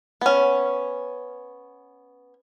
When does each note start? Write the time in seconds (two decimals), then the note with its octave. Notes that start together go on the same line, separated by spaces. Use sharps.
0.21 B3 C#4